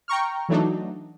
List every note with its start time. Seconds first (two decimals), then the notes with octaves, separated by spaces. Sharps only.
0.08 G5 A#5 C#6 F6
0.49 E3 F#3 A3 D4 D#4